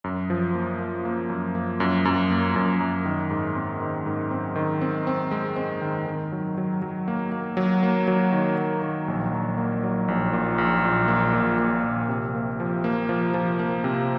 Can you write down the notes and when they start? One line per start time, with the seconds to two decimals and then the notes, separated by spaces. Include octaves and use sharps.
0.04 F#2
0.30 F3
0.54 A#3
0.79 A#3
1.05 A#3
1.30 F#2
1.55 A#3
1.80 F#2
2.05 F#2
2.31 A#3
2.56 F#2
2.80 F#2
3.06 D#3
3.31 G#2
3.55 C4
3.81 D#3
4.06 G#2
4.31 C4
4.56 D#3
4.81 C4
5.07 C4
5.31 G#3
5.56 C4
5.81 D#3
6.06 D#3
6.32 F#3
6.57 F#3
6.82 F#3
7.08 A#3
7.32 A#3
7.57 F#3
7.83 A#3
8.08 F#3
8.33 D#3
8.58 F#3
8.82 D#3
9.08 A#1
9.33 A#1
9.57 A#3
9.83 F#3
10.08 A#1
10.33 A#2
10.58 A#1
10.84 A#2
11.08 A#3
11.34 A#2
11.59 A#3
11.84 A#1
12.09 C3
12.35 A#3
12.60 F3
12.84 A#3
13.09 F3
13.34 F3
13.59 A#3
13.84 C3